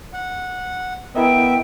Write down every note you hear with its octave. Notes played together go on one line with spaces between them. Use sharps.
F#5
B3 E4 A#4 D#5 E5 G5